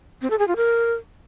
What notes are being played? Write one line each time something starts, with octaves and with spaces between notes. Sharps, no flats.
C4
A4
G#4
F4
A#4